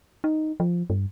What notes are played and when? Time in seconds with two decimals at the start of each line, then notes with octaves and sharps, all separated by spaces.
0.24 D#4
0.60 F3
0.90 G2